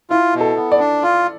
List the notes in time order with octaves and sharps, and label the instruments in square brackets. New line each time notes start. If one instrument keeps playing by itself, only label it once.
[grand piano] E4 [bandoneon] F4
[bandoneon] B2
[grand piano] A4
[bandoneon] B3
[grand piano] D5
[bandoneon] D4
F4